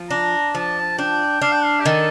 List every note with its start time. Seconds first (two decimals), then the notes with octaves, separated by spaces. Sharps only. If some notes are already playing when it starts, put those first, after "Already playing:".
Already playing: F3
0.10 D4 A#5
0.55 F3 A5
0.98 D4 G5
1.41 D4 F5
1.52 G5
1.64 F5
1.81 G4
1.86 D#3 A4